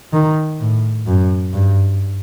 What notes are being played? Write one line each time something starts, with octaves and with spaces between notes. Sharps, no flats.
D#3
A2
F#2
G2